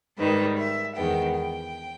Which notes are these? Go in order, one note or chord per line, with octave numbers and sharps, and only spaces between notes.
G#2 D#3 G3 B4
E5
E2 D#3 G#3 B3 G5
G5